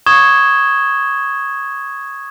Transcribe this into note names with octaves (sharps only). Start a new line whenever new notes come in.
C#6 D#6 G#6 E7 G7